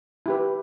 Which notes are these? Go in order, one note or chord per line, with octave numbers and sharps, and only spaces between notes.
E4 G4 B4